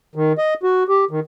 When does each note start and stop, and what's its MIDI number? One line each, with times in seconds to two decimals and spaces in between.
0.15 0.33 51
0.38 0.54 75
0.63 0.83 66
0.88 1.05 67
1.11 1.20 51